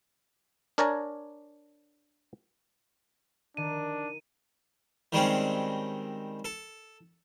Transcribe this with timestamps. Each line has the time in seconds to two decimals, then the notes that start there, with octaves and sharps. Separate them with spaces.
0.78 D4 A#4 C#5 D5 G#5 A#5
3.57 D#3 D4 D#7
5.12 D#3 G3 G#3 C4 C#4
6.45 A4